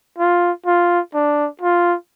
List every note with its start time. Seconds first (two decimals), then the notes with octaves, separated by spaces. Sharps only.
0.18 F4
0.66 F4
1.14 D4
1.62 F4